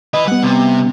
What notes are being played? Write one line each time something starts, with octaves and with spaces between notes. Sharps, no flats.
E4 B4 D#5
G3 B3 F#5
C3